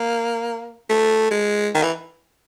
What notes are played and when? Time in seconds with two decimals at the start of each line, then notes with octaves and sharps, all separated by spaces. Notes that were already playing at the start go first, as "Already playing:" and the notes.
Already playing: A#3
0.90 A3
1.31 G#3
1.75 D#3
1.83 E3